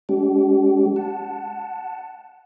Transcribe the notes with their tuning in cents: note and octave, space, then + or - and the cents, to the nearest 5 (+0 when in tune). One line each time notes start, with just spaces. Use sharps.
G#3 +0 C#4 +45 G4 -40
F#5 +0 A5 +0